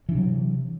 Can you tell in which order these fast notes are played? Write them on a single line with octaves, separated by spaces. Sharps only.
E3 D4 C3 F#3